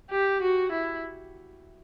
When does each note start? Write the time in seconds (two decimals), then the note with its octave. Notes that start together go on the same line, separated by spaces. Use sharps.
0.11 G4
0.42 F#4
0.72 E4